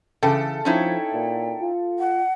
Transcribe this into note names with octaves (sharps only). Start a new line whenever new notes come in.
C#3 E3 A4 G5
F3 C#4 D#4 E4 G5
A#2
F4
F#5